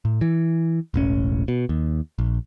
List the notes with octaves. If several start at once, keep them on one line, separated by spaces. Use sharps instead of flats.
A2
E3
E1 A1 C#4
B2
D#2
A#1